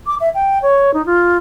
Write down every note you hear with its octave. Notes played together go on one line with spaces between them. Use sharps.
D6
E5
G5
C#5
D#4
F4